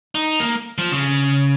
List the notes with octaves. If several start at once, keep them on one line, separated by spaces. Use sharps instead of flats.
D#4
A#3
F3
C#3